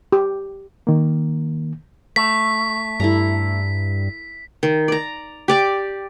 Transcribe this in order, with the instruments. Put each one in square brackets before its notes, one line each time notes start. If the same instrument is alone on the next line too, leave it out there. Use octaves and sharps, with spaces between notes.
[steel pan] G4
[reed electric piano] D#3 A#3
[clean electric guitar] A3 [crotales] B6
[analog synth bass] G2 [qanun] E4 A4 A#5
[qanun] D#3
D5 A#5
G4 D5 D6